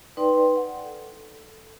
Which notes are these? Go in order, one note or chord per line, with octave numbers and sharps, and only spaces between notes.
D#4 B4 D5 G5 C6
F#5
A4